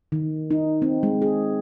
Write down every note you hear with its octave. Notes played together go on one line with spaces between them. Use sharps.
D#3
D#4
C4
G#3
G#4